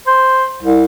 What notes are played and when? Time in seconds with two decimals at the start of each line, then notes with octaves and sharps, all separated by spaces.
0.07 C5
0.63 C2